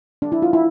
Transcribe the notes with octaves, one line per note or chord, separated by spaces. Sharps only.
D4
E4
F4
E4